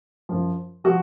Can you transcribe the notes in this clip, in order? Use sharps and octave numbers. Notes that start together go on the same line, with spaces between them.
F#2 F3
F3 F#4